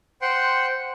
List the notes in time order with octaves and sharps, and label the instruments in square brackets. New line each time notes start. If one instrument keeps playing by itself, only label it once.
[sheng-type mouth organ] C5 F#5 G5 C6